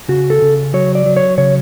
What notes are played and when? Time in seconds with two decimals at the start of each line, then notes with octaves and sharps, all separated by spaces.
0.08 C#3 F#4
0.30 A4
0.42 C#3
0.74 F#3 C#5
0.95 D5
1.06 F#3
1.17 C#5
1.38 C#3 C#5